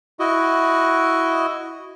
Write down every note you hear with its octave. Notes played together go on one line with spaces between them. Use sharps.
E4 F#4 D#5